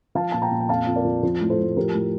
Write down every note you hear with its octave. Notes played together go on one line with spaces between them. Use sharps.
F3 F5 A5
A#2 A5
G5 A#5
A#2
G5
F2 F5 A5
F2
A#4 D5
F3
F3
A2
A4 C5
A2
F3 G4 A#4
A2